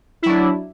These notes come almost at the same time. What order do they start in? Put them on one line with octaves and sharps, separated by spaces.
E4 F#3 D4